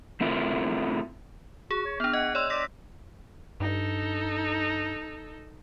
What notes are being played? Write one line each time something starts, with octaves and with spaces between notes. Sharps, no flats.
A3 C4 E4 F4 A#4
F#4 G#4
C#5
B3 D4 F6
D#5 F#5
C#5 D5 C6 E6
D5 E6 A#6 B6
G2 D#4 A4